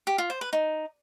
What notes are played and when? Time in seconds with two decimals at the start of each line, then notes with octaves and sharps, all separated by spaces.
0.07 G4
0.18 F4
0.30 C5
0.41 B4
0.53 D#4